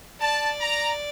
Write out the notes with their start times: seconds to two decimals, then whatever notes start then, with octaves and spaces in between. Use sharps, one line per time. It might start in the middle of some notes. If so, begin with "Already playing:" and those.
0.20 D5 A5
0.61 A#5